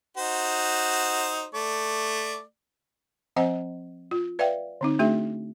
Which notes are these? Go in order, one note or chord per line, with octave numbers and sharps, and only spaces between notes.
D#4 F#4 C5
A3 D5
F3 C4 C5 D#5 F#5 G#5
F4
B4 D5 E5 F5 G5
D3 C4 D#4
A3 D4 F#4 G#4 E5